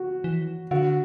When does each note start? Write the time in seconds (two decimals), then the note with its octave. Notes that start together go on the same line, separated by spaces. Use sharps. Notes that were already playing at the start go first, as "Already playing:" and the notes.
Already playing: F#4
0.24 E3
0.71 D3 F#4